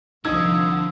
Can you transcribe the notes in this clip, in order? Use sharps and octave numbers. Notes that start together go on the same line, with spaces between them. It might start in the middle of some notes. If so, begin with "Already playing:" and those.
C2 D3 D#3 F3 D#4 D#6 E6 G#6